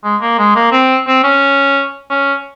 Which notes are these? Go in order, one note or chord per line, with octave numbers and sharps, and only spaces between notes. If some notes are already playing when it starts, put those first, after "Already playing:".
G#3
A#3
G#3
A#3
C4
C4
C#4
C#4